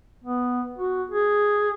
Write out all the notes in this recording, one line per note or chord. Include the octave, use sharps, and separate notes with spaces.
B3
F#4
G#4